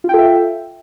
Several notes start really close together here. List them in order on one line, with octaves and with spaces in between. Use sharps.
F4 G5 A4 E5